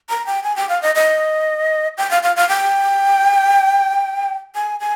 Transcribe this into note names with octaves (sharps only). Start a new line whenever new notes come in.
A#5
G5
G#5
G5
F5
D#5
D#5
G5
F5
F5
F5
G5
G#5
G#5